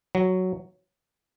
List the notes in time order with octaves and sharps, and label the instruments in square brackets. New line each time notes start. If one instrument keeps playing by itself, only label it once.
[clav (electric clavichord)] F#3